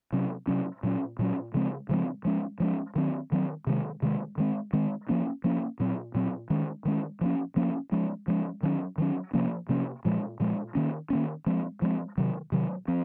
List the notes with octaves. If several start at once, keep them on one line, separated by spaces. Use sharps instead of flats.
C3 F#3 C#4
C3 F#3 C#4
A#2 F#3 C#4
A#2 F#3 C#4
C#3 F3 G#3 C4
C#3 F3 G#3 C4
F3 G#3 C#4
F3 G#3 C#4
D#3 F#3 C4
D#3 F#3 C4
C3 D#3 G#3
C3 D#3 G#3
D#3 G#3 C4
D#3 G#3 C4
F3 A#3 C#4
F3 A#3 C#4
A#2 F#3 C4
A#2 F#3 C4
D#3 G#3 C#4
D#3 G#3 C#4
F3 A#3 C#4
F3 A#3 C#4
F3 G#3 C#4
F3 G#3 C#4
D#3 F#3 C#4
D#3 F#3 C#4
C3 F3 A#3 C#4
C3 F3 A#3 C#4
A#2 F3 G#3
A#2 F3 G#3
D#3 A#3 C#4
D#3 A#3 C#4
F3 G#3 C4
F3 G#3 C4
C3 D#3 F#3
C3 D#3 F#3
F3 C4